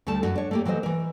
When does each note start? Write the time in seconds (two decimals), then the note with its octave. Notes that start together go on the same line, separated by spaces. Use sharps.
0.07 D2 G3 A3 A4 A5
0.23 F#2 F#4
0.36 D4 C#5
0.51 A3 A#3 G4
0.65 E3 F#3 A3 C5 D#5
0.83 E3 A#4